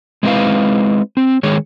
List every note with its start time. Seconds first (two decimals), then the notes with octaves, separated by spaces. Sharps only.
0.23 G#3 C4 D#4 E4 B4 F5
1.17 C4
1.43 D#3 G#3 G#4 C#5